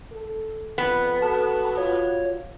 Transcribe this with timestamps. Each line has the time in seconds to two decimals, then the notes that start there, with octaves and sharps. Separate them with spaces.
0.12 A4
0.78 F2 B3
1.22 F#4 A4 A5
1.78 F4 C#5